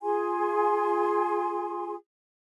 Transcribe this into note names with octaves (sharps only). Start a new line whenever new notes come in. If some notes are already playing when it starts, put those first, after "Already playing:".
F4 G#4 G#5 C6